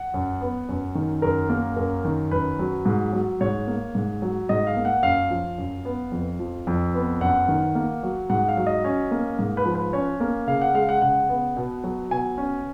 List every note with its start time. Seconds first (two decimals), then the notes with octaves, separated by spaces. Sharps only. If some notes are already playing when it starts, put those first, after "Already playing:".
Already playing: F#5
0.14 F#2
0.41 B3
0.69 F#2
0.95 D#3
1.22 F#2 A#4
1.49 A#3
1.76 F#2 A#4
2.05 D#3
2.31 F#2 B4
2.59 F#3
2.85 G#2
3.13 F#3
3.41 G#2 C#5
3.67 A#3
3.95 G#2
4.22 F#3
4.49 G#2 D#5
4.67 F5
4.77 A#3
4.85 F#5
5.03 F#2 F5
5.30 F3
5.58 F#2
5.85 B3
6.12 F2
6.39 F3
6.67 F2
6.94 B3
7.21 F#2 F#5
7.48 D#3
7.75 A#3
8.03 F#3
8.29 G#2 F#5
8.48 F5
8.57 F#3
8.67 D#5
8.84 C#4
9.11 A#3
9.39 G#2
9.57 B4
9.66 F3
9.75 B4
9.93 C#4 C#5
10.20 A#3
10.47 C#3 F5
10.61 F#5
10.74 G#3 F5
10.89 F#5
11.02 C#3 F#5
11.29 B3
11.57 B2
11.84 F#3
12.11 B2 G#5
12.38 C#4